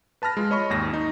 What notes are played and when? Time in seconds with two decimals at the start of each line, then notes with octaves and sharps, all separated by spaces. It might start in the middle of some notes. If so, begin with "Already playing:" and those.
0.22 B4 A5 B5 F6 A#6
0.37 G#3 F4
0.50 C#5 D#5 B5 C#6
0.70 G#1 D#2 A#6
0.93 D#4